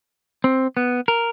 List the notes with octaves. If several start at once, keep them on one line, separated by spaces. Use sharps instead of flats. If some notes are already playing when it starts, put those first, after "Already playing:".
C4
B3
A#4